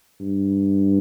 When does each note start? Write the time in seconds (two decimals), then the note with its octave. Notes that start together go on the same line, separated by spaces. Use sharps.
0.20 G2